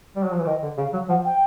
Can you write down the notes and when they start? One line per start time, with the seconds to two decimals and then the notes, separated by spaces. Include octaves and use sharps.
0.16 G3
0.24 F#3
0.32 F3
0.39 E3
0.46 D#3 D#5
0.63 D3
0.78 C#3 F5
0.93 F#3
1.09 F3 F#5
1.25 G5